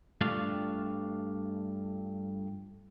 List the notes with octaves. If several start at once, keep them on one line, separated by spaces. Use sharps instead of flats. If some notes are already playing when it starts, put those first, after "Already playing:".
G2 A3 D4 F4 F5